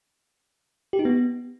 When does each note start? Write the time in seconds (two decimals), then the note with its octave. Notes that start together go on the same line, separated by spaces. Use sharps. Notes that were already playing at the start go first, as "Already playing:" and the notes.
0.93 G4
0.99 D#4
1.05 B3